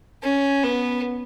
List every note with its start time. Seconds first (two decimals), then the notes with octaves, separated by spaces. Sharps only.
0.23 C#4
0.63 B3